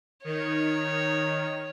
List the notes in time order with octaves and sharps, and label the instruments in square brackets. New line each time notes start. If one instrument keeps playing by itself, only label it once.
[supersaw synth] D#3 [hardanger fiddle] C#5